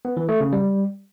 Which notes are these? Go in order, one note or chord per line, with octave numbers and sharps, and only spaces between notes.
B3
E3
A3
C#3
G3